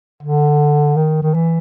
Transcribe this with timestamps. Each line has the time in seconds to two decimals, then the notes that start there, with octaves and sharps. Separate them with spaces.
0.23 D3
0.96 D#3
1.23 D#3
1.34 E3